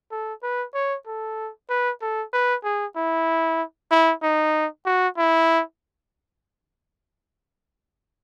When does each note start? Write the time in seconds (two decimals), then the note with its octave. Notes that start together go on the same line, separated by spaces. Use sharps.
0.11 A4
0.43 B4
0.74 C#5
1.06 A4
1.69 B4
2.01 A4
2.33 B4
2.64 G#4
2.96 E4
3.91 E4
4.22 D#4
4.86 F#4
5.17 E4